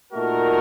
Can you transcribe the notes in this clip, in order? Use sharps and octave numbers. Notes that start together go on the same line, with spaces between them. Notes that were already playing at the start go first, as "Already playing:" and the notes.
A#2 A3 D#4 F#4 A#4